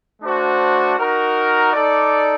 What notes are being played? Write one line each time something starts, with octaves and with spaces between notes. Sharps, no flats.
A3 D4 F#4 C5
D#4 F#4 A#4
D#4 A4 D5